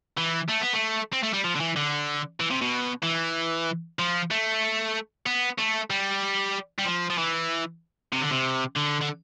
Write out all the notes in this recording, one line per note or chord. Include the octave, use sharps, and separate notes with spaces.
E3
A3
B3
A3
C4
A3
G3
F3
D3
E3
D3
E3
C3
B2
E3
F3
A3
B3
A3
G3
G3
F3
F3
E3
C3
D3
C3
D3
D3